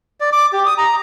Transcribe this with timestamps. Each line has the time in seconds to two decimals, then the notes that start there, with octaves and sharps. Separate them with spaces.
0.20 D5
0.32 D6
0.53 G4
0.66 D#6
0.78 A#5